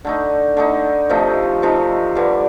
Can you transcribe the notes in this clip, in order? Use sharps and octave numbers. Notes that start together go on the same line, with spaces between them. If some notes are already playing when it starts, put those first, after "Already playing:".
D3 A3 D#4
D3 A3 D#4
C3 F3 A3 D#4
C3 F3 A3 D#4
G2 D3 G3